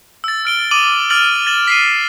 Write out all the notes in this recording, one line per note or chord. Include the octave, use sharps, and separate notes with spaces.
E6 A6
F6 D7 G7
D6 D#6 D#7 F#7
D6 F6 A6 D7 F7 F#7
A6 E7 F#7
B6 C7 D#7